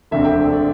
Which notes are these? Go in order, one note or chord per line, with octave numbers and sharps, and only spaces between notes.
E1 D2 D3 C4 E5
G5
D5